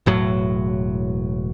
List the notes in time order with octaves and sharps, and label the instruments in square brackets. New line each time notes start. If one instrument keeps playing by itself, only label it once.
[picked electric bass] E1 A2 F#3